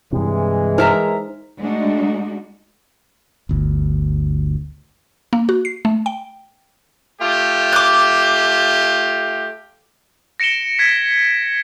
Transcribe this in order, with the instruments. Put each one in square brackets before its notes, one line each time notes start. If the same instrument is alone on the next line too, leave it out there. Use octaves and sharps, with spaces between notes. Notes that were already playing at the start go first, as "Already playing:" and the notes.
[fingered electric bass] G2 C3 [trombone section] E3 G#3
[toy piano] D#4 C5 [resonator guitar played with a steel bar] A#4 E5 A#5
[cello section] G#3 A3 D4 D#4 F#4
[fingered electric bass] G1 D2
[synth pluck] A#3
F#4
C7
A3
G5
[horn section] A3 F4 G4
[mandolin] D6 F#6
[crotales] A#6 C#7 D7 E7 G7
G#6 B6